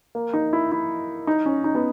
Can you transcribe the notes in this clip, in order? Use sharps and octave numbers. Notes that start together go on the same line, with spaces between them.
A#3
D#4
E4
E4
D#4
C#4
D#4
B3